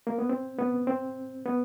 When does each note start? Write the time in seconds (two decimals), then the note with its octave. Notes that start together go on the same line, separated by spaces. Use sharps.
0.07 A#3
0.18 B3
0.29 C4
0.58 B3
0.87 C4
1.46 B3